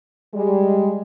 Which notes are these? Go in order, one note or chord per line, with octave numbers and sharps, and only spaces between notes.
G3 G#3